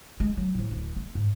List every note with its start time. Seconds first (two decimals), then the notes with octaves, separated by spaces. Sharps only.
0.20 G#3
0.37 F#3
0.55 A2 F3
0.71 D1
0.96 B3
1.15 G#2